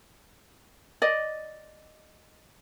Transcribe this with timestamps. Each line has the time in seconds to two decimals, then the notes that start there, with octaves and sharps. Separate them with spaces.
1.02 D5 D#5